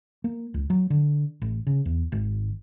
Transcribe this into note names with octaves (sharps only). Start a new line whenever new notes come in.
A#3
C#2
F#3
D3
A1
C#3
E2
G#1